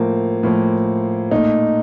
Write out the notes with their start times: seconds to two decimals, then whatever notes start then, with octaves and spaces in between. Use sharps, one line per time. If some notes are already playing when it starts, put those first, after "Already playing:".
Already playing: A2 F3 A#3
0.43 A2 F3 A#3
1.31 A#2 A3 D#4